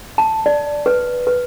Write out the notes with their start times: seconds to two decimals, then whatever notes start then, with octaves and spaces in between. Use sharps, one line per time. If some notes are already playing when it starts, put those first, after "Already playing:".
0.18 A5
0.46 D5
0.86 B4
1.27 B4